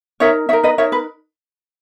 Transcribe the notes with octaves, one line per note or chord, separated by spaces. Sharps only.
D#4 A#4 C#5 E5
D#4 A#4 C#5 E5
B4 D#5
D#4 A#4 C#5 E5
B4